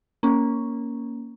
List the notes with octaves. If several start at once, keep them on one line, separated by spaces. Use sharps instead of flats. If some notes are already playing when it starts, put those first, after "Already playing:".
A#3 C#4